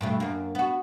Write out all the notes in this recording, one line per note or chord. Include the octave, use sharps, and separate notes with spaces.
G2 B2 A3
F#2 A#3
B3 F#4